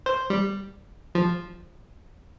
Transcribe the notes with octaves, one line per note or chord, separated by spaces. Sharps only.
C5
G3
F3